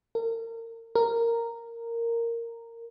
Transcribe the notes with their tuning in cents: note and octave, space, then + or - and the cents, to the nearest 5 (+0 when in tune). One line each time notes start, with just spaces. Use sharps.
A#4 -35
A#4 -10